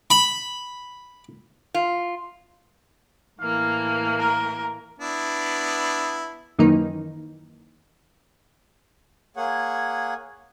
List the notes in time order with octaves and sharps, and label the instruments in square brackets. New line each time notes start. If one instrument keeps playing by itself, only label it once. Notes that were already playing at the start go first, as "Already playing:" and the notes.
[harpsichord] B5
[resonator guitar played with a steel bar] F4
[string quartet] A2 E3 A#3 [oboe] F5
[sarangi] A#4
[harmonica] B3 D4 E4
[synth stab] F#2 D#3 E3 A#3 D#4
[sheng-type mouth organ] A#3 G#4 C#5 F#5